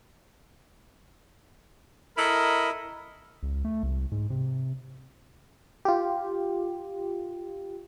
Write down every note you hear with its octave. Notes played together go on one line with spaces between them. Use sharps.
E4 A4 A#4 D#5 B5
C#2
A3
C2
G#2
C3
F4 G4